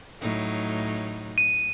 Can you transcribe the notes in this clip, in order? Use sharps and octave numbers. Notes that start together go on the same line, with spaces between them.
A2 F#3 D#4
D#7